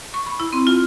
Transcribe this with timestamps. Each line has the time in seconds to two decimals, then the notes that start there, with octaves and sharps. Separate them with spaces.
0.14 C#6
0.26 B5
0.40 E4
0.53 C4
0.67 F4